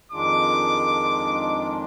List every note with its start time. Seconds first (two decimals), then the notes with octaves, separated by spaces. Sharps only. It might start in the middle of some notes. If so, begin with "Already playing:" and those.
0.12 F2 D#3 G#3 D4 F4 D6